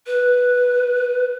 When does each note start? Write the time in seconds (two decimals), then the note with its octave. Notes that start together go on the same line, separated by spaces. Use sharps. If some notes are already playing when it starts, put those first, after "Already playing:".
0.06 B4